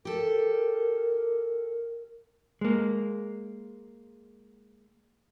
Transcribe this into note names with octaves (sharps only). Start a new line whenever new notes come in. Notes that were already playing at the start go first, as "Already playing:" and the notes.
G4 A4 A#4
G#3 A#3